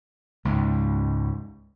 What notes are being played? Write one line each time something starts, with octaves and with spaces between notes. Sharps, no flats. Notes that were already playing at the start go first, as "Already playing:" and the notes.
C#2 G#2